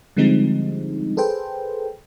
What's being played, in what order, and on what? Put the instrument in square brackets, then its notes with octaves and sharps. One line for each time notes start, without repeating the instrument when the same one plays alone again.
[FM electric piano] D3 F3 G3 G#3 C4 D#4
G#4 A4 B4 C5 G5